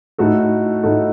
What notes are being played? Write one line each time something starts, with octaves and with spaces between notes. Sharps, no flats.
A2 A3 D#4 F#4 A4
A2 A3 D#4 F#4 A4